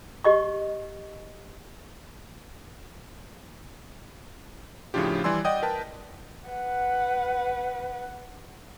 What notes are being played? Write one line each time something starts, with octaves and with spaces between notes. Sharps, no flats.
G4 D#5 C#6
A2 C#3 F3 D4 F4 G4
E3 G3 D5 G#5 C6 E6
D5 D#5 F#5 G5 D#6
A#4 B4 G5 A5
B4 F#5